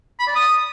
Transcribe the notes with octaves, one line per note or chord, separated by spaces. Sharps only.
B5
D5
D#6